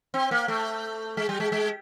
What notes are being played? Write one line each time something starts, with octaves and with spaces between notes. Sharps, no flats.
C4
A#3
A3
G#3
G3
G#3
G#3